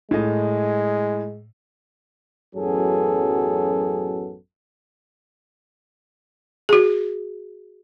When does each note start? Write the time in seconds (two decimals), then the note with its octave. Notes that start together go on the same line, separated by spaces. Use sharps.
0.11 A2 G#3 D#5
2.56 A1 F#2 F#3 B3 G#4 A4
6.69 F#4 G#4